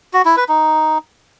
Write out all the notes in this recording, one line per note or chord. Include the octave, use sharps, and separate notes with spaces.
F#4
E4
B4
D#4